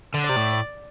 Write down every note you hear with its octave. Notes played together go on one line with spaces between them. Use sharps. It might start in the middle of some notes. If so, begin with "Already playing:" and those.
D3
C3 D5
A2